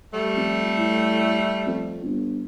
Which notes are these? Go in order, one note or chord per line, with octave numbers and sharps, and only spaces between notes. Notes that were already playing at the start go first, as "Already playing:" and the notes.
G3 A3
F2
A2
F2
G1